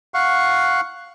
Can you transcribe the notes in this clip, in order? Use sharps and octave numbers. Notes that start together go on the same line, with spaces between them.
F5 F#5 C#6